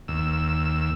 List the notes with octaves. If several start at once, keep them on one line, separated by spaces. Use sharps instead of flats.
D#2 E6